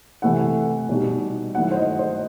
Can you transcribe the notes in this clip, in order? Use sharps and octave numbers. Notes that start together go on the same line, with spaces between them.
C3 E3 A3 E4 F#5
B2 G3 D#4
D#3 F#3 A3 E4 F#5
C5
D#5
C5